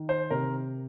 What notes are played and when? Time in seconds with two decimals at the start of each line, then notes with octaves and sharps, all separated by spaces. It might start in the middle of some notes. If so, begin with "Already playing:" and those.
Already playing: D#3
0.09 C5
0.31 C3 A#4